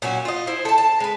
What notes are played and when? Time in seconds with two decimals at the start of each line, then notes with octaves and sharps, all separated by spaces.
0.02 A#2 F#3 C#4 F#4
0.25 F4 D#5
0.47 E4 C5
0.65 A4 A5
0.78 A5
1.00 G#3 B4